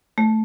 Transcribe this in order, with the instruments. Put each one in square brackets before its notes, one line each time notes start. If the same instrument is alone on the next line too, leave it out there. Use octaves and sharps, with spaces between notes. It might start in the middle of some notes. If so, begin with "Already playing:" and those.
[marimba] A3